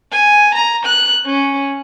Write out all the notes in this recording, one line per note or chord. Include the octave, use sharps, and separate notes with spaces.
G#5
A#5
F#6
C#4